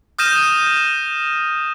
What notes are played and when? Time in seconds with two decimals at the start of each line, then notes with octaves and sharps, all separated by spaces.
0.19 D#6 F6 G6 A#6 D#7 E7